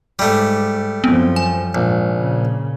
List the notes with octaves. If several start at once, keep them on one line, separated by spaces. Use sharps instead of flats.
G#2 G3 A3 D6
F#2 F3 B3 C4
G#5
A#1 G#2
A#2 C#3